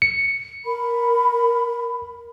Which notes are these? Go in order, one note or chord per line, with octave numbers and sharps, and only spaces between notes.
C#7
A#4 B5